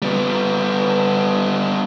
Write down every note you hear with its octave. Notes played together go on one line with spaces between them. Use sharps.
G3 B3